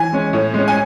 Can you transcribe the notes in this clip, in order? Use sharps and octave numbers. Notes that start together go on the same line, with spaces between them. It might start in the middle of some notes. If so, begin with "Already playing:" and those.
Already playing: E3 G#5
G#3 C#4
A2
G#3 C#4
G#5